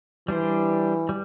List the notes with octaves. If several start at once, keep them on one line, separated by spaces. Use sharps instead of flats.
E3 G3 D4 G4 C5
G3